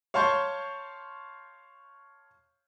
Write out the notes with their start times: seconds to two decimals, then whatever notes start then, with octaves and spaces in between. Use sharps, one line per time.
0.14 C#5 F5 A5 C6 C#6 G6